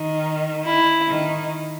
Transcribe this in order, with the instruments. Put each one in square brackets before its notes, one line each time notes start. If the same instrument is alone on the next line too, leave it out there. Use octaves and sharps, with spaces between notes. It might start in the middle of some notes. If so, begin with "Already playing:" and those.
Already playing: [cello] D#3
[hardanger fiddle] E4
[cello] D#3